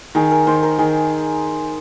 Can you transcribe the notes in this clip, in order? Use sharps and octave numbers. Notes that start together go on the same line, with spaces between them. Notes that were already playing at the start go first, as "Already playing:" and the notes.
D#3 G#4
A#4
D#3 C5
A#4
D#3 G#4